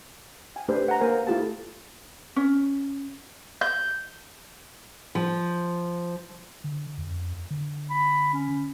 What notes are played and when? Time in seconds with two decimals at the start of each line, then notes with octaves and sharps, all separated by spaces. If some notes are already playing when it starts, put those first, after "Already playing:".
0.56 G5 G#5
0.68 A3 D4 G4 B4 C5
0.88 F#5 A#5
1.01 A#3 A#4 C5 G#5
1.27 A3 E4 F4 G4 A4 A5
2.36 C#4
3.61 G6
5.15 F3
6.64 D3
6.98 F2
7.51 D3
7.90 B5
8.33 C#4